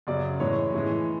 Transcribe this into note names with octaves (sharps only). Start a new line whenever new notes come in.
F#2 C#3 F#3 D5
A2 E3 G#3 C#5
A2 E3 G#3